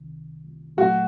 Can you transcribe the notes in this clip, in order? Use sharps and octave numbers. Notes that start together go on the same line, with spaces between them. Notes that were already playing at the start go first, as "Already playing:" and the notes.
Already playing: C2 C3 D#3
A#2 F#3 A3 F#4